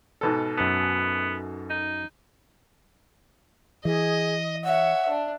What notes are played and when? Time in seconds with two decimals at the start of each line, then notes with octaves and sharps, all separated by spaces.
0.21 G#2 B2 A4
0.58 F#2 B3 A5
1.70 D#4
3.85 E3 G#4 D#5
4.65 C#5 E5 F#5
5.08 D4